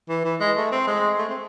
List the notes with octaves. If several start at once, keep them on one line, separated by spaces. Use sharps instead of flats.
E3
E3
G#3
A3
C4
G#3
A3
C4